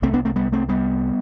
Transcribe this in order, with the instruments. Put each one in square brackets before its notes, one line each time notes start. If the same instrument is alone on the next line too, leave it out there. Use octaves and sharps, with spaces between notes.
[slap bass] C2 C3 A3 C4
B3 D4
A3 C4
G3 B3
A3 C4
G3 B3